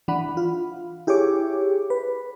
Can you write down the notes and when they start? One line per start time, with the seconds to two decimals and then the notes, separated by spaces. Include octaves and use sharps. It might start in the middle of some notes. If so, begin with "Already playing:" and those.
0.08 E3 D4 F#5 B5
0.37 F4
1.07 E4 G4 G#4 C#5 D6
1.90 B4